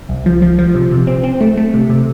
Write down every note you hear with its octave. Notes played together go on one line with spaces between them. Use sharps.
C2
F3
F3
F3
C3
C3
C4
C4
A3
A3
C3
C3